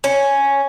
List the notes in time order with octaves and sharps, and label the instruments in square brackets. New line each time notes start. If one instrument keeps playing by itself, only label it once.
[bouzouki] C#4